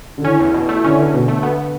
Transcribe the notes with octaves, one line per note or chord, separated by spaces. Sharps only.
D3
E3 C#4
E2
B2
A3 E4
D3 C#4 D4
E2
B2
A3
B3